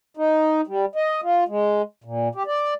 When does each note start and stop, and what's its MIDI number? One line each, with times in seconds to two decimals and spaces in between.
0.17 0.61 63
0.67 0.85 55
0.95 1.21 75
1.23 1.44 65
1.48 1.82 56
2.04 2.28 46
2.35 2.43 67
2.46 2.74 74